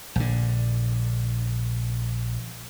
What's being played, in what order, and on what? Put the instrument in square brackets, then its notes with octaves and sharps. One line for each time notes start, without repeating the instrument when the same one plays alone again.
[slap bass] A#1 D3